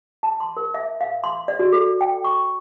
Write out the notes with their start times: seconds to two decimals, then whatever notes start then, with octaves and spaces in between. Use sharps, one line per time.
0.23 A5
0.40 C6
0.57 A#4
0.74 E5
1.01 F5
1.24 C6
1.48 D5
1.59 F#4
1.72 A4
2.01 G5
2.24 C#6